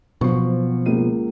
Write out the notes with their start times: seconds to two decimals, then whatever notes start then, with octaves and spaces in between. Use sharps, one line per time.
0.21 B2 F3 F#3 C4 C#6
0.86 C#2 A#3 D#7